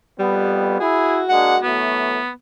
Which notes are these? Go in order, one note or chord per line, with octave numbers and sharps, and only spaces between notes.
F2 G3 B3
E4 F#4 G#4
G#3 A#3 D4 F#5
E3 F#3 A3 B3